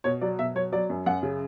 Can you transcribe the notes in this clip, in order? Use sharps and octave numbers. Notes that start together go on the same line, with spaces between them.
B2 C#5
F#3 D5
B2 E5
F#3 C#5
F#3 D5
F#2
F#2 F#5
C#3